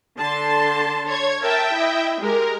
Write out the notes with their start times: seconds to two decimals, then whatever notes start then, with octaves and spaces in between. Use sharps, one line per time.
0.17 D3 A5 C6
1.05 C#5 G#6
1.40 A#4 E5 G5 A5
1.73 E4 D#5
2.21 G#3 G4 A#4